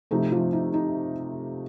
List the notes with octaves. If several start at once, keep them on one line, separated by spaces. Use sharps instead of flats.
C3 F3 A3 D#4
F3 F4
D#4
D#4